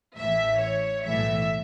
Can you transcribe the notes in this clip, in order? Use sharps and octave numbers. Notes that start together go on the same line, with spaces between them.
A1 A2 E3 E5
C#5
B1 A2 E3 E5